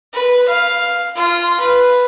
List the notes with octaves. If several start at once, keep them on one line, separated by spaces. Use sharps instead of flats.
B4
F5
F4
B4